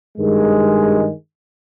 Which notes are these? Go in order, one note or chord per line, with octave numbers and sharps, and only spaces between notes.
G2 D#3 G#3